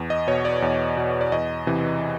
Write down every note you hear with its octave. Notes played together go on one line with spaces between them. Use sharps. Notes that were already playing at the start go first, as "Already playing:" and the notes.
Already playing: E2
D#5
B2 C#5
D5
E2
B2
D5
E2 D#5
C3 E3